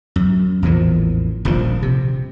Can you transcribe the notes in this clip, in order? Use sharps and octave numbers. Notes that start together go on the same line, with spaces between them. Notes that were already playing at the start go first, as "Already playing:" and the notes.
F#2
A1 E2 A#2 F3
D#1 A#1 A#2 F3
C3